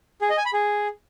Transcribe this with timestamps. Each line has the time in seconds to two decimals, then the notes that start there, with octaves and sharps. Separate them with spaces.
0.22 G#4
0.30 D#5
0.38 G#5
0.45 B5
0.53 G#4